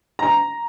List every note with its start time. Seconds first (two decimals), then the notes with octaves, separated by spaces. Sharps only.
0.19 A#5